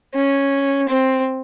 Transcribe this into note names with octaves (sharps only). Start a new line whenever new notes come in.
C#4
C4